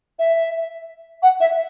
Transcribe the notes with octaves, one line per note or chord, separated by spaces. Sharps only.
E5
F#5
E5